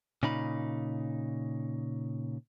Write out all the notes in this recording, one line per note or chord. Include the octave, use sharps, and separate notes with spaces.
A#2 C#3 D#4 B5